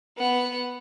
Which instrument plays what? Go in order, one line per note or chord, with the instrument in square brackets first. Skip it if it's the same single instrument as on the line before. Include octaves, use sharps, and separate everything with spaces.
[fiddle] B3 F#5